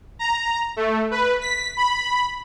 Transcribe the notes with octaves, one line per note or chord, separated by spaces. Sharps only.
A#5
A3
B4
B6
B5